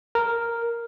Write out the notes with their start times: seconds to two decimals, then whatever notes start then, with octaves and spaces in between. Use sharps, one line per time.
0.15 A#4